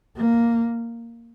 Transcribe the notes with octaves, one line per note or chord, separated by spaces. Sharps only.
A#3